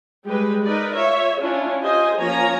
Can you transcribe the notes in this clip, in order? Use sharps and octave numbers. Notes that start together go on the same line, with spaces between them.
G3 G#3 G4 B4
D#4 A#4 B4 D5
F4 C#5 E5
C#4 D4 E4 F4 C#5
F4 G4 C5 D#5 G#5
F3 A#3 C#4 C#5 G#5 A#5